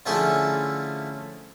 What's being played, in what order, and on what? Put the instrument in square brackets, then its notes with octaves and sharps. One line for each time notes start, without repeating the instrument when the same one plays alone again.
[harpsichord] D3 F3 A3 C#4 E4 G#4